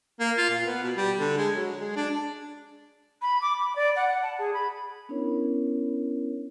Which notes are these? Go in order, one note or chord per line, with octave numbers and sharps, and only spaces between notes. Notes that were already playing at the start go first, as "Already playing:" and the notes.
A#3
F4
A#2
B3
B2
G3
D3
G#3
F#3
G#3
D4
B5
D6
B5
D5
F#5
F#5
A5
G#4
B5
B3 C#4 D4 E4 A#4 C#5